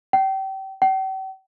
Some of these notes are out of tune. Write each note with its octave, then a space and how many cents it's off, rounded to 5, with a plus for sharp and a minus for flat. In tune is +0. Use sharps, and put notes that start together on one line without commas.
G5 -30
G5 -45